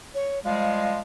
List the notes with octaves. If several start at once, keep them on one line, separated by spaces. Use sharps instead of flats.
C#5
F3 G3 G#3 F5